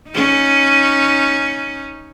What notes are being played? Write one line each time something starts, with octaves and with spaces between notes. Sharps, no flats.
C#4 D#4